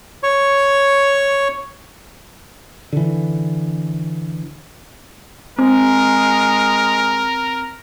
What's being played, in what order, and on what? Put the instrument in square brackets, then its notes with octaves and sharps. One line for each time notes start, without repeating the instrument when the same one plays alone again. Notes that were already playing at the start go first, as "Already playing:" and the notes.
[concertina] C#5 C#6
[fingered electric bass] D3 E3
[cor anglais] G#3 [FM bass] C4 [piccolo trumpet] A#4